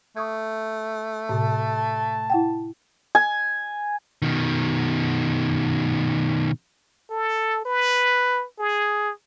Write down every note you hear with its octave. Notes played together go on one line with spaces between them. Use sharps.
A3 C#6 D#6 G#6
A2 C3 A5
E4 F#5 G5
G#5
B2 D#3
A4
B4
G#4